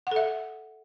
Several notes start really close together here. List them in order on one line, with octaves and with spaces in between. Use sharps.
F#5 A4 E5